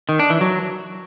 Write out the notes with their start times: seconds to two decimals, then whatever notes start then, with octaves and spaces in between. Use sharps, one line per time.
0.09 D#3
0.19 D4
0.30 E3
0.41 F#3